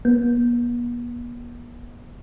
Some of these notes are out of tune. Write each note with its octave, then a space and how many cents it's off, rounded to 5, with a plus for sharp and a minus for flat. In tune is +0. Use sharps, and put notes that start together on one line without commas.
B3 -45